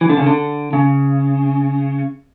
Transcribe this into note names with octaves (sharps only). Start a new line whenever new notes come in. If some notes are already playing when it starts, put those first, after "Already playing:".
E3
D3
C#3
D3
C#3